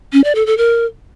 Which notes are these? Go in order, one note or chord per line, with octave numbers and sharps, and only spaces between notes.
C#4
D5
A4
A4
A#4